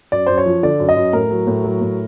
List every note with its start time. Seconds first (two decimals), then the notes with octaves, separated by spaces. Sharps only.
0.12 F#2 D5
0.26 F#2 C5
0.38 C#5
0.46 F3
0.63 D3 D5
0.80 F#2
0.89 D#5
0.96 F#2
1.13 A2 A#4
1.30 F#3
1.47 A2
1.64 F#3
1.81 A2